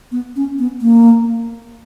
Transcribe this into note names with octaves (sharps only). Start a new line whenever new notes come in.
B3
C#4
B3
A#3